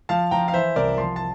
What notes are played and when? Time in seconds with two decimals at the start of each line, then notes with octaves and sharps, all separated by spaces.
0.09 F3 F5 A5
0.31 F3 G5 A#5
0.48 F5
0.54 E3 C5 E5
0.76 C2 A#4 D5
0.98 F3 A5 C6
1.16 A5